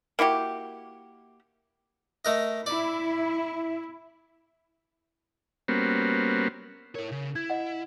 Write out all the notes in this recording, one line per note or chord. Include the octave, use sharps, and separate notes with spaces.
A#3 E4 F#4 G4
A3 A#4 D#5
E4 D5
G3 A#3 B3 C#4 F#4 C5
E4 A#4 C#5
C#3
E4 G#6
D#5 F#5